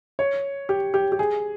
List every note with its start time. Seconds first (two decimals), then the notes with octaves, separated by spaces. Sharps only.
0.19 C#5
0.69 G4
0.94 G4
1.12 G4
1.19 G#4